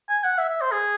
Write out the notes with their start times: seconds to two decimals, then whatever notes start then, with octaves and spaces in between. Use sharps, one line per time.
0.09 G#5
0.24 F#5
0.38 E5
0.49 E5
0.61 C5
0.72 G#4